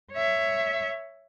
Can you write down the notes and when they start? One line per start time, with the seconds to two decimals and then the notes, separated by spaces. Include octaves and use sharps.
0.12 C#5 E5